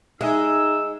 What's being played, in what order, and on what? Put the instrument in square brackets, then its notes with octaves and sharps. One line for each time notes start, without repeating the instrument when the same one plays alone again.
[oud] G#3 [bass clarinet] D#4 [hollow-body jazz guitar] G#4 E5 G#5 [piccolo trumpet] E6